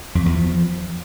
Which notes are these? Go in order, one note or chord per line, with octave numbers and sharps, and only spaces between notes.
F2
E2
F3